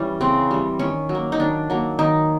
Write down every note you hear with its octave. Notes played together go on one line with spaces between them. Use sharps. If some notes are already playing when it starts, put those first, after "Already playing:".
Already playing: E3 G3 C#4
C#3 C4
E3 G3
D#3 C#4
F#3
A#3
D#4
D#3 D4
F#3 A#3
D#3 D#4